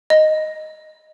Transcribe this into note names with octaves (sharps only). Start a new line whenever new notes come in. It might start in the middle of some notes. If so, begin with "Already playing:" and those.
D#5